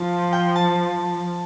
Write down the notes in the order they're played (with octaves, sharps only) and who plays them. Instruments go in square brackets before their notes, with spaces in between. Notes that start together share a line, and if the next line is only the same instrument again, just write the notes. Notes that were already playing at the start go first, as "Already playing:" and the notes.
Already playing: [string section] F3 [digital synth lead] A5
[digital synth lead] G5
A5